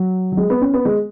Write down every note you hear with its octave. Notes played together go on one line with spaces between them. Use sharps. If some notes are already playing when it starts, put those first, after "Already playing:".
Already playing: F#3
F#3
G#3
B3
C#4
B3
G#3